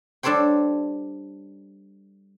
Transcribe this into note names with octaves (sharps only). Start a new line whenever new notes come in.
G3 D4 A4 C5 C#5 G5